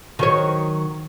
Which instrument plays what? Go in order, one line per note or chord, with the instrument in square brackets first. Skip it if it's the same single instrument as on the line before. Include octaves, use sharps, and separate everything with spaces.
[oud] D#3 F#3 C#5